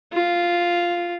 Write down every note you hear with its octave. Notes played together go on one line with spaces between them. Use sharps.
F4